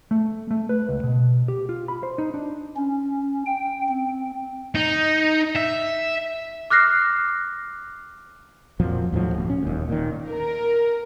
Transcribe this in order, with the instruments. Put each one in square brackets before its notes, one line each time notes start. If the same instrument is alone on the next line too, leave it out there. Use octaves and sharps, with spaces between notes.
[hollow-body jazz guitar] A3
A3
B4
C#2
B2
G4
F4
B5
C5
D#4
D4
[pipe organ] C#4
G5
C4
[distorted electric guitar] D#4
E5
[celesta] D6 F6 F#6 A#6 C7
[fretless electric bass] F2 A#2 F3 F#3
D#2 A2 F3 F#3
D1
C#4
D#1 D#2
A#2 D#3
[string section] A#4